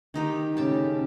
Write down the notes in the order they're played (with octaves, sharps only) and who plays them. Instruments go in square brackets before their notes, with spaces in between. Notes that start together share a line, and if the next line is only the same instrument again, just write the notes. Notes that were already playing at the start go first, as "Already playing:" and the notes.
[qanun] D#3 D#4 G4
[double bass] C#3 A3 [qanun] G4 A5